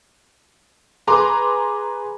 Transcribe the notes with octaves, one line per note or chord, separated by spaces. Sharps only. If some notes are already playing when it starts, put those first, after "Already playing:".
G#4 B4 A#5 C6 D6